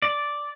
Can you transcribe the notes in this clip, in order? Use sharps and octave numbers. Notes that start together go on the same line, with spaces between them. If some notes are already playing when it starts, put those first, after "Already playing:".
D5